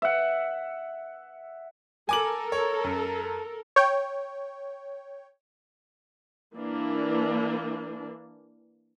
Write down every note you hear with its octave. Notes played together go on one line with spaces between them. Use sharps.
E5 F#5
A4 A#4 G#5 D6 F#7
C#5
F#2
C#5 G5
E3 A#3 D4